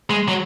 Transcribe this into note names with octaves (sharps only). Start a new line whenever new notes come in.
G#3
F#3